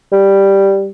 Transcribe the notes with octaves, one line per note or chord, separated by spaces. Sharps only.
G3